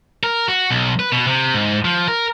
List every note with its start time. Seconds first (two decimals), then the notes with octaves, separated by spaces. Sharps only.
0.24 A#4
0.48 F#4
0.71 B1
0.99 B4
1.12 B2
1.27 C3
1.54 G#2
1.85 F3
2.08 A#4